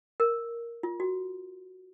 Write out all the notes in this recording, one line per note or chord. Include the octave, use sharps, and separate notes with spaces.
A#4
F4
F#4